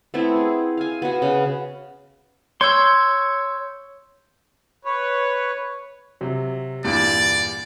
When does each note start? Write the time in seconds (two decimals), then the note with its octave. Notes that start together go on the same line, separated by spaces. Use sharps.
0.14 A3 B3 C4 E4
0.36 G#4
0.77 F5 G#5
1.02 B3 F#4
1.22 C#3
2.61 C#5 C6 E6 G6 G#6
4.85 B4 C#5
6.21 C3 F#3
6.84 E2 G2 A#2 D5